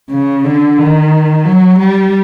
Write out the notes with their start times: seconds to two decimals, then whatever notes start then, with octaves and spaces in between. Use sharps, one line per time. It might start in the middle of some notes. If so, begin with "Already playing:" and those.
0.10 C#3
0.44 D3
0.78 D#3
1.45 F#3
1.79 G3